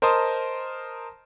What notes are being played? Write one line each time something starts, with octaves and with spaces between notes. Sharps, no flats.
A#4 C5 D#5 A5 C6 D#6